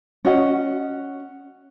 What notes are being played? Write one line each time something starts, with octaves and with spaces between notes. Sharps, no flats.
C#4 F#4 D#5 F#5